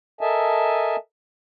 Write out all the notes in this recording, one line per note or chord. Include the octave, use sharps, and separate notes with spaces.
A4 A#4 D#5 E5 G#5 A5